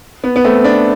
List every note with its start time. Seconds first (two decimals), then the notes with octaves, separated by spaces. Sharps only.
0.24 B3
0.36 B3
0.44 A3 C4
0.64 B3 D4